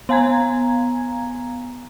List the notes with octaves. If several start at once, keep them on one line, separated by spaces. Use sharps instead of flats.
B3 F5 G#5 A#5 G#6